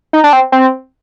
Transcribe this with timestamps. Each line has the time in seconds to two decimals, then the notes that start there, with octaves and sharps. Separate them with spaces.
0.13 D#4
0.24 D4
0.33 C4
0.52 C4